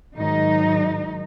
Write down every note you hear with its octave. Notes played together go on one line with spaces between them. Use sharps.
G#2 D#3 F#3 D#4